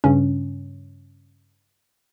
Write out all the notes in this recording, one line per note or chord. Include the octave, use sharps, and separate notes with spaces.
G2 C#3 C#4